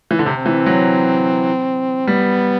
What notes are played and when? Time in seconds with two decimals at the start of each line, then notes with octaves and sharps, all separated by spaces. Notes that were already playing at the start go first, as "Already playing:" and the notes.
0.11 E3
0.19 D3
0.26 C3 C4
0.46 E3
0.66 F#3
2.08 G3 B3